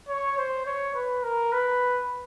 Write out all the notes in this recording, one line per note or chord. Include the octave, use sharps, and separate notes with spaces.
C#5
C5
C#5
B4
A#4
B4